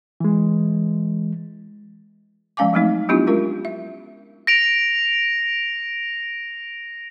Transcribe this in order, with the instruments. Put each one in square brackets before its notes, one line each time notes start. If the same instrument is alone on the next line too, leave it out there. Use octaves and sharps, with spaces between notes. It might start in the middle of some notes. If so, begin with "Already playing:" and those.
[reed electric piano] E3 G#3
[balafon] F3 G#3 C#4 F5 G#5 D6
F3 F#3 G#3 A3 C4 D#4
F#3 B3 D4 E4 F4 G4
G#3 C#4 F4 A#4
E5
[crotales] A#6 D7 F7